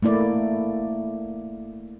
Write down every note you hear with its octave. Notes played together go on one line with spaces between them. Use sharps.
A3 A#3 E4 D5